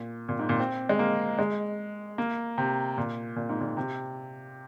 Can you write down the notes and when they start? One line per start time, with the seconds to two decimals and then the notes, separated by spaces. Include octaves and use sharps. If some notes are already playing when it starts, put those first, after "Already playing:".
Already playing: A#2
0.29 A#2
0.39 G#2
0.49 A#2
0.60 C4
0.89 G#3
0.99 A#3
1.39 G#3
2.18 A#3
2.58 C3
2.98 A#2
3.36 A#2
3.49 G#2
3.61 A#2
3.77 C3